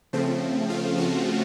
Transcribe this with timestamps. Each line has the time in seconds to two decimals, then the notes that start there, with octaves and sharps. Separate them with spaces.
0.13 C#3 F3 A3 C4
0.70 F4
0.98 F#4